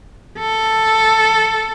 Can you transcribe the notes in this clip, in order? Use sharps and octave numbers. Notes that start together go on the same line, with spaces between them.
A4